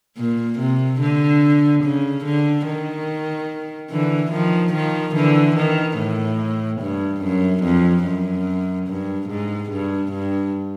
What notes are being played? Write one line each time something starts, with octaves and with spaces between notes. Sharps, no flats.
A#2
C3
D3
C#3
D3
D#3
D3 E3
D#3 F3
D#3 F3
D3 E3
D#3
A2
G2
F#2
F2
F#2
G2
G#2
G2
G2